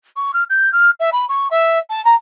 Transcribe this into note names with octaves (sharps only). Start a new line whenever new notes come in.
C#6
F6
G6
F6
E5
B5
C#6
E5
A5
A#5